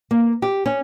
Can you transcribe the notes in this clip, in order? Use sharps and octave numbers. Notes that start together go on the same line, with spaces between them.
A#3
G4
C#4